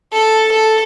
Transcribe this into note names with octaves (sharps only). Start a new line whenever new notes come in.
A4
A4